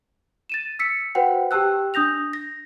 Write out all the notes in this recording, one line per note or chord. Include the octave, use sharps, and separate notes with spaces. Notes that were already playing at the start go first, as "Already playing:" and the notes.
A6 D#7 E7
E6 B6 C#7
F#4 B4 C5 F#5 G5
G4 G5 A5 E6 F#6
D4 D#6 G6 A#6 F7
A#6